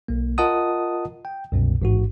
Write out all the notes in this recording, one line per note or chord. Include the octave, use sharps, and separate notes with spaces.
B1 A#3
F4 A#4 D#5 F#5 A5 D#6
G5
C2 F#2 B2
A1 G#2 F#4